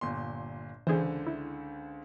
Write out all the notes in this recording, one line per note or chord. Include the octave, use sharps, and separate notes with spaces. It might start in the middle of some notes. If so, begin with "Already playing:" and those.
G1 A#2 C6
C#2 D3 E3 G#4 C5
E4